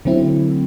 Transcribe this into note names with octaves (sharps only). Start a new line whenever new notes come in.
D3 F#3 A3 C4 E4